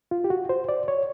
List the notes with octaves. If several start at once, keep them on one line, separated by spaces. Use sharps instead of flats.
F4
G4
F#4
C5
D5
C#5